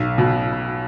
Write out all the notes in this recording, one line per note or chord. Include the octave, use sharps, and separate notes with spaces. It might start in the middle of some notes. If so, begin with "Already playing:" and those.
Already playing: B1
B2